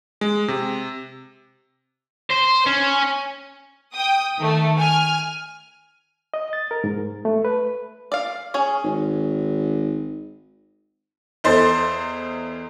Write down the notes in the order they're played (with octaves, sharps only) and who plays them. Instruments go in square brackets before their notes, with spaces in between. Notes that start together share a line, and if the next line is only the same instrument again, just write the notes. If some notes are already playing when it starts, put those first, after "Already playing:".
[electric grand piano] G#3
C3
[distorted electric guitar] C5
C#4
[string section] G5 D#6
D#3 A3
G#5 F6
[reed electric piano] D#5
A6
A#4
G#2
A3
B4
[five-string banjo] D5 F5
C#4 G#4 C#5
[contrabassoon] G#1
[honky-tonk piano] E2 A4 C5 D#5 C6 A6